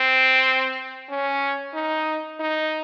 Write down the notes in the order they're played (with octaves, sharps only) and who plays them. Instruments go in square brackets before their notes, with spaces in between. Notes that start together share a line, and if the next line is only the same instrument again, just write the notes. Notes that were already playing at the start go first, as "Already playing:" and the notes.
Already playing: [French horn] C4
C#4
D#4
D#4